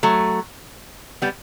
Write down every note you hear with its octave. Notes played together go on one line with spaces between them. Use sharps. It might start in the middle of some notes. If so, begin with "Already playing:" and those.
F#3 A3
G3 B3